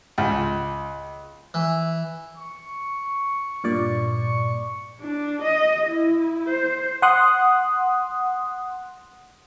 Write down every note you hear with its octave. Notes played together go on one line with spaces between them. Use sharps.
C#2
E3
C#6
G2 A#2 D5
D4
D#5
E4
C5
F#5 C6 D#6 F#6